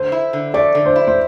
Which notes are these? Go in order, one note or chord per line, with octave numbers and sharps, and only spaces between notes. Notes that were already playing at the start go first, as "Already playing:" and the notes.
Already playing: D3 C5
E4
D3
A3 D5
D3
C5
E4
C5